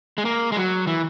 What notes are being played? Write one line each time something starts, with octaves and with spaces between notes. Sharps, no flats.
G#3
A#3
G#3
F#3
E3